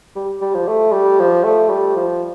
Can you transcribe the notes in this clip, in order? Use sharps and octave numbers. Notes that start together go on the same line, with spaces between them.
G3
G3
F3
A3
G3
F3
A3
G3
F3